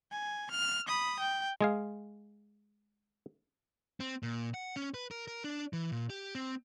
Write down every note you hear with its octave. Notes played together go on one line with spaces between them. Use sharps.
G#5
F6
B5 D#6
G5
G#3 G#4 F5
C4
A#2
F#5
C#4
B4
A#4
A#4
D4
E3
A#2
G4
C4